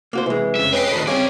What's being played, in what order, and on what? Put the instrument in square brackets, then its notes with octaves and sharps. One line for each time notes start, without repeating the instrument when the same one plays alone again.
[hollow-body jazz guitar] A#3 F#4 C5
[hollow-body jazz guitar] C2 G#3 [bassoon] E3
[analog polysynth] F2 C#3 [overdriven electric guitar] E5
[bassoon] C#4 [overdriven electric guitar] G4 G5 [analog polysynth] B4 D#5 C7
[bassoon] D2 [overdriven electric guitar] A2 D#3
[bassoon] C#3 [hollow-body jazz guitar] G3 C4 [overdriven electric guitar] C#4 D5 [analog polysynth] G#5